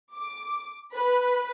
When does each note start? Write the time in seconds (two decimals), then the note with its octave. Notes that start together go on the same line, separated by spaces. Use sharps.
0.14 D6
0.94 B4